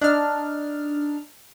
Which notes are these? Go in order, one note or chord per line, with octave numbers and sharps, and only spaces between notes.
D4 D#4 F6